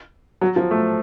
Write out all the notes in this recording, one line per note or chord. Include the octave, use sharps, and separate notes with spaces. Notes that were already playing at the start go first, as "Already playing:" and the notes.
F#3
F3
A3